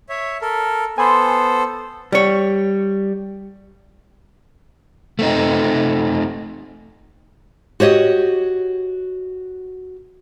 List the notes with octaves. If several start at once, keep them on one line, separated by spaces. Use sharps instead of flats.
C#5 E5
A4 A#4
B3 A4 C5 G#5 B5 C6
G3 C#5
A3 C4 D#4
F#4 G4 C#5 D#5